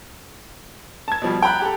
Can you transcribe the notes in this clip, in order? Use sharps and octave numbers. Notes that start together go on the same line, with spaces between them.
A5 G#6
B2 F3 G3
G5 A#5 B5 F#6
G4 A4